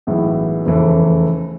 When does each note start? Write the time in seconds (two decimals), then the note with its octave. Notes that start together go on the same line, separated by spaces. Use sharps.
0.07 B1 A2 E3 G#3 B3
0.66 F1 E2 C#3 E3 A3